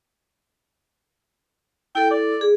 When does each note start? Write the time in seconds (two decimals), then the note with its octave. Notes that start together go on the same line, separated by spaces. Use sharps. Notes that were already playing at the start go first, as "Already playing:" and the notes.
1.95 E4 A4 G5
2.11 D5
2.41 G#4